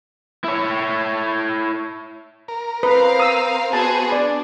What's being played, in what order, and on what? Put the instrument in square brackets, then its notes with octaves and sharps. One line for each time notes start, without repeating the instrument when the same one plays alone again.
[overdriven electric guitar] E4 C#5
[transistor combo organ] A#4
[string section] C4 F5 [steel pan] B4
[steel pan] D#6 E6
[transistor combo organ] B3 [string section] F#4 G#4 C5 [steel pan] A5
[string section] D4 [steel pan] D5